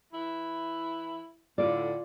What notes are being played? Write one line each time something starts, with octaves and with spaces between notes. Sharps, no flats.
E3 E4
A2 D3 F4 D5